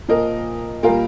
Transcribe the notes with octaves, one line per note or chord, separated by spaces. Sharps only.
A#2 F3 A#4 D#5
A#2 G3 F4 A#4